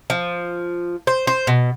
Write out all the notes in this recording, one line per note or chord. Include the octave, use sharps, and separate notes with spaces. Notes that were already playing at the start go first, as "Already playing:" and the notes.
F3
C5
C5
B2